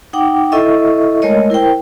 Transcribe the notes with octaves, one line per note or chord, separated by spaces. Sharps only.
D#4 F#5 G5 D6
E4 A4 D#5 E5 C#6
G#3 A3 A#4 C#5 D#5
E4 A#4 C5 G5